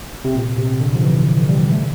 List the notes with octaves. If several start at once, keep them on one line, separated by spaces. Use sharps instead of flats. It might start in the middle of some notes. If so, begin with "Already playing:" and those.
C3
A#2
C3
D3
F3
E3
G3
A3